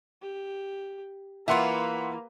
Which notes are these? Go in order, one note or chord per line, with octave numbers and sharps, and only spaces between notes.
G4
E3 A#3 F4 B4 E5 F#5 B5 C6